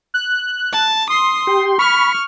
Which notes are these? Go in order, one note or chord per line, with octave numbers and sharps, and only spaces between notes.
F#6
A5
C6 D#6
G4
B5 C#6 F6